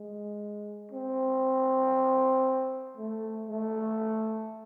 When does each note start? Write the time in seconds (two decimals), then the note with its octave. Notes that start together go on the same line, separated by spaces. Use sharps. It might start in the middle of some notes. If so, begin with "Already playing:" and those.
Already playing: G#3
0.91 C4
2.97 A3
3.49 A3